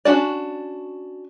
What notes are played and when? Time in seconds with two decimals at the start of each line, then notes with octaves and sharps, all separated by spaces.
0.05 C#4 D4 F#4 D5